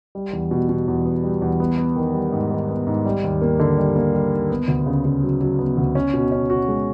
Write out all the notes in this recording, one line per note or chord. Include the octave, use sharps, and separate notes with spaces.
G3
E2
B2
B2
E2
B3
G3
E2
B3
B3
D#3
G3
G#2
D#3
B3
G#2
G3
D#2
A#3
D3
G3
A#3
G3
D#2
B3
D2
C#3
C#3
F#3
F#3
B3
D2
C#4
B2
C#4
F#4
G#3